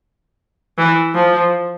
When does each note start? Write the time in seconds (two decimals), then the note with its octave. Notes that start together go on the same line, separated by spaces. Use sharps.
0.78 E3
1.15 F3